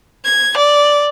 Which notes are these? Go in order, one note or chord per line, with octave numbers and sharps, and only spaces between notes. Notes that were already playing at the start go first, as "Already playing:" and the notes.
G#6
D5